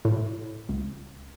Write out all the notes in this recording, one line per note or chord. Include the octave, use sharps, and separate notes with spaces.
A2
C#2